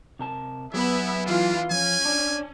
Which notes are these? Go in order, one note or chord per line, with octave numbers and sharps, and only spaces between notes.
C3 A#4 A5
F#3 B3 E4 G4 G#4 E5
E3 D4 F4
F3 C#4 G#5
D4